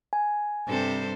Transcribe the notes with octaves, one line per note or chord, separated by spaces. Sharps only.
G#5
G2 C3 G3 A4 C5